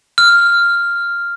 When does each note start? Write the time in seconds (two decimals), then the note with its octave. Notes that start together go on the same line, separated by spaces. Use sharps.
0.18 F6